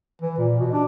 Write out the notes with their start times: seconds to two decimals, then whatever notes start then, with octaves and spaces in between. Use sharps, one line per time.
0.22 E3
0.37 A#2
0.59 B2
0.73 D4